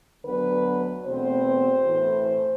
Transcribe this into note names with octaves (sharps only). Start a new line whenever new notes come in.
D2 D3 F#3 B3 B4
E2 B2 A3 C4 C5
A2 E3 A3